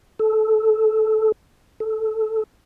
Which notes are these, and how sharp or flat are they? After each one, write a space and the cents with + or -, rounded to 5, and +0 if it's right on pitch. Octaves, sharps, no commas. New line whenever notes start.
A4 -15
A4 -5